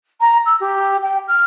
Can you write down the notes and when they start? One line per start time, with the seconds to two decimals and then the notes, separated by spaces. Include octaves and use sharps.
0.21 A#5
0.46 E6
0.61 G4
1.03 G5
1.28 F6